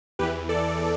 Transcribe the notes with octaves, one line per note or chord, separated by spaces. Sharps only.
E2 E3 G4 B4
A4 D5